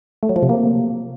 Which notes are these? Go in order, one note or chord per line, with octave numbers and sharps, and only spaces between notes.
A3
F#3
F3
C3
A#3